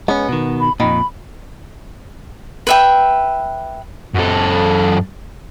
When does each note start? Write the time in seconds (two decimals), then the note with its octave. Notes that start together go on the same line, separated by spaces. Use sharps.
0.08 G#3 B3 C#4
0.29 B2 D#3
0.60 B5
0.80 F2 A#2 D#3 B5
2.67 B4 E5 G5
4.15 F#2 A4